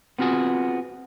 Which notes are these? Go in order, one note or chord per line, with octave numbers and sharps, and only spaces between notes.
B3 C4 F4 F#4 G#4